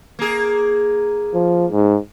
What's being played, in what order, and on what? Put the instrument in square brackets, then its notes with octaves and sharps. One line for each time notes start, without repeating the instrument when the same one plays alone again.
[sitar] A#3 G#4
[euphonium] F3
G#2